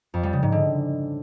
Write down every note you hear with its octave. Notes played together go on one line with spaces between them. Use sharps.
F2
G3
C#3
G#2
D3